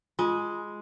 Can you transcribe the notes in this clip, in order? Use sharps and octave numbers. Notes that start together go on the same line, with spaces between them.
G#3 F4